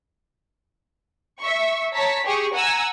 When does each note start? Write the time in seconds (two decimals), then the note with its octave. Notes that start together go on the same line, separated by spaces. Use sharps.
1.39 E5 C#6
1.93 C#5 A5 A#5 B6
2.25 G4 G#4 C#6
2.55 F#5 G#5 A#5 E6